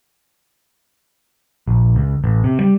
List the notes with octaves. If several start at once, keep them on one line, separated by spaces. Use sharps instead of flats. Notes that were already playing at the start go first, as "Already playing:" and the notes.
A#1
C#2
A1
C3
G3